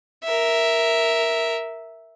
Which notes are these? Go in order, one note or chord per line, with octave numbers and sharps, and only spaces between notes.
A#4 E5